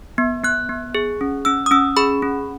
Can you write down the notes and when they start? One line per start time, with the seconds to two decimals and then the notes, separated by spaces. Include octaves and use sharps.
0.18 B3
0.43 B3 F#6
0.69 B3
0.95 G#4
1.21 C#4
1.45 C#4 E6
1.66 D#6
1.71 C#4 E6
1.97 G#4 B5
2.22 C#4